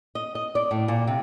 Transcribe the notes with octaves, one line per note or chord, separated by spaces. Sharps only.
D#5
D#5
D5
A2
A#2
C3